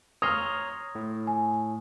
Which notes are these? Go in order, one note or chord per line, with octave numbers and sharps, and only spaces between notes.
C#5 A#5 C6 D#6 F6
A2
G#5